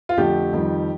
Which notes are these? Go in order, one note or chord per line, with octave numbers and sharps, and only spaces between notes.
F4
F2 D3 A3 G4
F2 D#3 G3